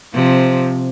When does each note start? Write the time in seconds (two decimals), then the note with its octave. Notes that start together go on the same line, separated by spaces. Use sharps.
0.14 C3 F3